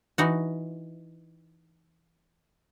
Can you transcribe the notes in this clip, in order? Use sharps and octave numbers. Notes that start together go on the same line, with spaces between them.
E3 D#4 F#4